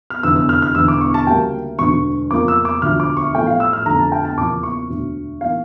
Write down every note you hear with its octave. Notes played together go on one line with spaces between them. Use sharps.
F6
F1 E2 D3 E6
E6
F6
F6
E1 E2 D3 E6
D6
C#6
A5
D2 C#3 G3 A#3 G5
E1 D2 D3 C#6
F2 C#3 F3 A#3 D6
E6
D6
E1 D2 D3 F3 F6
D6
C#6
A1 A2 F3 A3 G5
F5
E6
F6
F2 D3 A3 A#5
A5
G5
A5
E2 C#3 F3 A#3 D6
C#6
E1 D2 D3
E3 A#3 F5